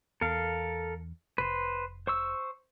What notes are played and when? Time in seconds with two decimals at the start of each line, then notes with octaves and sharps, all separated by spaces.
0.21 E2 A4 A#4 F5
1.38 F1 B4 C5
2.07 C5 C#6 E6